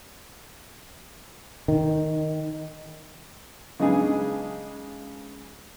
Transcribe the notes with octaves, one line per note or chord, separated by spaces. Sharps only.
D#3
C#3 G#3 B3 D4 D#4 G#4